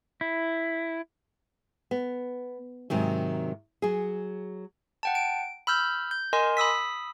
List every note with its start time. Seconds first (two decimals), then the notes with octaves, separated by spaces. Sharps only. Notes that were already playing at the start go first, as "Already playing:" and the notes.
0.21 E4
1.91 B3
2.90 G#2 C3 D#3 F#3
3.82 F#3 G#4
5.03 F#5 G5 A5
5.15 D7
5.67 B5 E6 F6 G6
6.11 G6
6.33 A#4 D#5 G#5 C6
6.57 B5 D#6 E6 B6